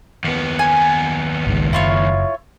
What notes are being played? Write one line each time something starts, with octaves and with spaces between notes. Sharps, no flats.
D#2 B3
G#5
G#1 C#2 G#2
F#1 E4 F4 C#5